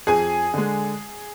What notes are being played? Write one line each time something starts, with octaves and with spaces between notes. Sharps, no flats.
F2 G#4 G#5
D3 G#3